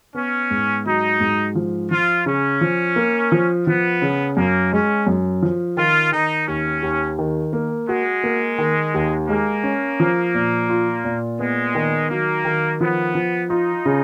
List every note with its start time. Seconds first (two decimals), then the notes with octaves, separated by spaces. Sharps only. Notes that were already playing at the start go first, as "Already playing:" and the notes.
0.15 B3 C#4
0.51 G#2
0.85 F#3 D#4
1.20 G#2
1.55 F3
1.91 F3 F4
2.26 C#3 C#4
2.61 F3
2.96 A#3
3.32 F3
3.67 F3 B3
4.02 C#3
4.37 F#2 A#3
4.71 G#3 C#4
5.07 F#2
5.43 F3
5.77 D#3 F4
6.12 D#3 D#4
6.48 D#2 C#4
6.83 D#2
7.19 D#3
7.53 A#3
7.88 G#3 F#4
8.24 A#3
8.58 D#3
8.94 D#2
9.29 G#3 A#3
9.63 C#4
10.00 F3
10.34 A#2
10.70 F4
11.05 A#2
11.39 G#3 B3
11.75 D#3
12.10 F#3 A#3
12.45 D#3
12.81 F3 B3
13.15 F3
13.50 D#4 F4
13.86 C#3